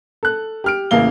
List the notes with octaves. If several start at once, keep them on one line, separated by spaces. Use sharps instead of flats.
A4 F#6
G4 F6 D7
A1 C#3 A#3 F5 G7